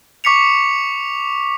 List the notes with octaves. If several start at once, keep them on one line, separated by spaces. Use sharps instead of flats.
C#6 D6 B6 C#7 F7